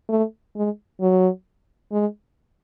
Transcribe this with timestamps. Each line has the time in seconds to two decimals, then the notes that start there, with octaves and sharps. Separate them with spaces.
0.09 A3
0.56 G#3
1.01 F#3
1.92 G#3